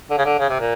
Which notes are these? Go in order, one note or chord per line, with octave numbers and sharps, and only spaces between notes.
D3
C#3
D3
C#3
C3
A#2